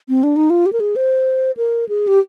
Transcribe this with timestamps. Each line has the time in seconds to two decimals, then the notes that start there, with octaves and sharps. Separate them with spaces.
0.09 C4
0.23 D4
0.36 D#4
0.50 F4
0.66 G4
0.73 A#4
0.80 G#4
0.96 C5
1.57 A#4
1.89 G#4
2.07 G4